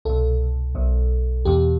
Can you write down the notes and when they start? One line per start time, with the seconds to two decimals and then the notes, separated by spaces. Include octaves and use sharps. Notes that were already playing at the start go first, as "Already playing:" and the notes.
0.05 C2 B2 A4
0.75 B1 B2
1.45 E2 B2 G4